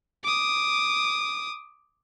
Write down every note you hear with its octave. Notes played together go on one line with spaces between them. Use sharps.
D6 D#6